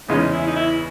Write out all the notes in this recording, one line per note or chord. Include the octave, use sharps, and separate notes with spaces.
E2 C#3 E3 G#3 C#4 D#4
E4
D#4
E4